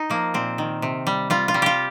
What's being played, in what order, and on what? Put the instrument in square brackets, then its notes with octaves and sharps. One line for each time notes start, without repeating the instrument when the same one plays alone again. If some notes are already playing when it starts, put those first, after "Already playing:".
Already playing: [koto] D#4
F3 A#3
A#2 C4
D#3
C3
G3
G3 F4
F4
G3
F4 G4